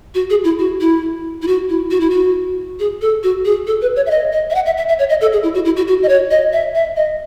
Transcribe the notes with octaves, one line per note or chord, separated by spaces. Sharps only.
F#4
G#4
E4
F#4
E4
E4
F#4
E4
F#4
E4
F#4
G#4
A4
F#4
G#4
A4
B4
C#5
E5
D#5
D#5
E5
F#5
E5
E5
E5
C#5
D#5
A4
G#4
E4
F#4
E4
F#4
F#4
D#5
C#5
D#5
E5
E5
D#5